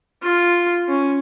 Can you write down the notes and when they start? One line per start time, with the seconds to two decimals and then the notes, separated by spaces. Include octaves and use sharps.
0.23 F4
0.88 C#4